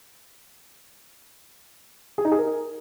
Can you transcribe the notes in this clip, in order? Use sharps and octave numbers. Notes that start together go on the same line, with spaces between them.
G#4
D#4
G#4
A#4